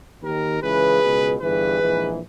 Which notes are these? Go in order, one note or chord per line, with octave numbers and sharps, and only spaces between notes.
D#2 D#3 G4 A#4
C#2 C#3 E3 G#4 B4
C#2 B2
G1 G2 E3 G#4 B4
A#1 G#2 E3